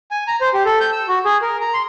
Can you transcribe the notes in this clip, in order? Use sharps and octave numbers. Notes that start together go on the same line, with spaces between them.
G#5
A#5
C5
G4
A4
G6
E6
F#4
G#4
A#4
A#5
C6